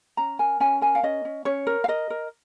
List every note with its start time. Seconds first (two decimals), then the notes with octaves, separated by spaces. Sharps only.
0.17 C#4 A#5
0.39 A#4 G#5
0.60 C#4 G#5
0.81 A#4 G#5
0.95 F5
1.03 C#4 D#5
1.25 C#4
1.45 C#4 C#5
1.67 A#4
1.84 F5
1.88 A#4 D#5
2.10 A#4